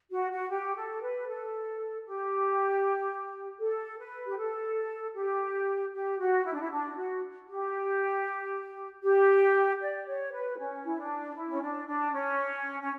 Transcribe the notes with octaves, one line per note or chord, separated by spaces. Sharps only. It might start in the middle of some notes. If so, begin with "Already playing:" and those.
F#4
F#4
G4
A4
B4
A4
G4
A4
B4
G4
A4
G4
G4
F#4
E4
D4
E4
D4
F#4
G4
G4
D5
C#5
B4
C#4
E4
D4
E4
C#4
D4
D4
C#4
C#4